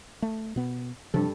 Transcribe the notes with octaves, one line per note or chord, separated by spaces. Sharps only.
A3
B2 B3
G2 C3 F3 A4